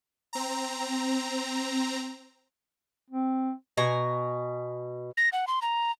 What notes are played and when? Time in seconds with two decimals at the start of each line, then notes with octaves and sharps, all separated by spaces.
0.33 C4 A#5
3.10 C4
3.77 B2 G#5 A#5
5.17 A#6
5.33 F#5
5.47 C6
5.62 A#5